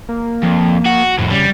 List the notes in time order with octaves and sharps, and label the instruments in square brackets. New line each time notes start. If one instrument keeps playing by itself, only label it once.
[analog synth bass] A#3
[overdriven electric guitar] F2
F#4
F2 A2
[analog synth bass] C#3 [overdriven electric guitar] G3